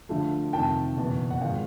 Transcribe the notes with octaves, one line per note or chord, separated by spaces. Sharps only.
D2 D3 F3 A3
F2 C3 D#3 G5 A5
F#1 E2 B2
F#5
G#1 F3 G#3 F5 G5